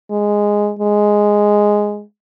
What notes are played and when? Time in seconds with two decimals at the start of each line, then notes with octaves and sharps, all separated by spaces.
0.11 G#3
0.79 G#3